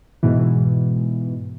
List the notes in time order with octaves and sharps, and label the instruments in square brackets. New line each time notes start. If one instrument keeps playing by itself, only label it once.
[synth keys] G#2 B2 E3